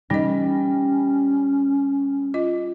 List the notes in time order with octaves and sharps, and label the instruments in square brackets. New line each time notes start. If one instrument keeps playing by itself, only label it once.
[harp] G3 [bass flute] C#4 [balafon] D#4 D#5
[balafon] F4 D#5